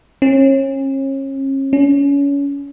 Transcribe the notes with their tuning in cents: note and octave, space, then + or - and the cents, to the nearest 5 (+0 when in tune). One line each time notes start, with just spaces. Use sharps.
C#4 -35
C#4 +30